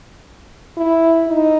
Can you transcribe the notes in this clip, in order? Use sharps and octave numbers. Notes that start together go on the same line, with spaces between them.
E4
D#4